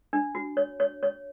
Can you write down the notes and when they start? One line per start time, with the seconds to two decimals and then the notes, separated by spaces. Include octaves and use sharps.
0.13 D4
0.35 F#4
0.57 C#5
0.80 C#5
1.03 C#5